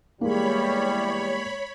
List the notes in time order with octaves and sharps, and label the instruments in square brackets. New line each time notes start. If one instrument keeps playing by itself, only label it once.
[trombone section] E2 E3 G3 [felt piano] G#3 A#3 [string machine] C#5 B5